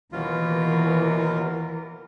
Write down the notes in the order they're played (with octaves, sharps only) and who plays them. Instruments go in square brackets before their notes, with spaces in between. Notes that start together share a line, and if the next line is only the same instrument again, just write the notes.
[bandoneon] D#2 B2 F4 [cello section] E3 A#4